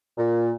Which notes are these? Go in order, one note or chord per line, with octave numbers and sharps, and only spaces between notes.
A#2